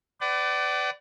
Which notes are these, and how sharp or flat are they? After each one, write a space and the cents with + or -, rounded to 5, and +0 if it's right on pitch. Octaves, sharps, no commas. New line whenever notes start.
B4 +35 D5 +0 F#5 +45